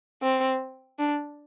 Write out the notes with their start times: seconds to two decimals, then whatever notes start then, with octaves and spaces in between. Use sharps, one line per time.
0.22 C4
0.99 D4